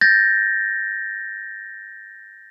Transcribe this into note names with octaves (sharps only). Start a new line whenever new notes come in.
G6 A6 A#6